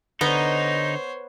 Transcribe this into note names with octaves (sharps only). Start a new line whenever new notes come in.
D3 B3 D#4 C5 C#5